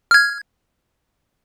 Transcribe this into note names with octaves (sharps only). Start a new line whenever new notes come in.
F6 G#6